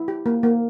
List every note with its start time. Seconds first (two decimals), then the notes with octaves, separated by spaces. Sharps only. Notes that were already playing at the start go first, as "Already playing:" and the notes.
Already playing: E4
0.08 G4
0.26 A#3
0.43 A#3